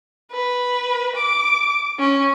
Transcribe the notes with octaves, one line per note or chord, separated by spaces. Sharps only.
B4
D6
C#4